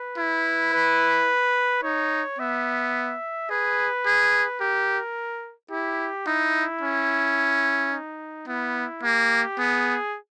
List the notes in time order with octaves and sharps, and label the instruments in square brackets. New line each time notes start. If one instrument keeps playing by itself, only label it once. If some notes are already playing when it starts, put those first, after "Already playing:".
Already playing: [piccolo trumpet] B4
[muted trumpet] E4
[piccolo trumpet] B4
[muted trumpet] D#4 [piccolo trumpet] C#5
[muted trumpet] B3 [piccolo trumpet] E5
[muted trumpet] G#4 [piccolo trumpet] B4
[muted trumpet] G#4
[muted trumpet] G4 [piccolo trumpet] A#4
[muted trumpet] E4 [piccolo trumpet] G4
[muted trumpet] D#4 [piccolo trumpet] E4
[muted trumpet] C#4
[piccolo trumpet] D#4
[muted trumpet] B3 [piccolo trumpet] E4
[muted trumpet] A#3 [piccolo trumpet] G4
[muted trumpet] B3 [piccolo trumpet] G#4